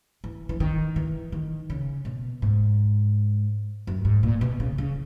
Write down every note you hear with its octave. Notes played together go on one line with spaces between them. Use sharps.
E3
E3
D#3
E3
D#3
C#3
B2
G#2
F#2
G#2
A#2
B2
C#3
C#3